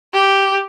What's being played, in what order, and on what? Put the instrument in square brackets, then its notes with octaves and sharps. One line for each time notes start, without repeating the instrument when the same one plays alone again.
[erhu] G4